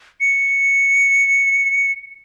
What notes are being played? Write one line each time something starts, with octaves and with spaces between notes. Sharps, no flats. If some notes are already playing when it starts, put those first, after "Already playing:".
C#7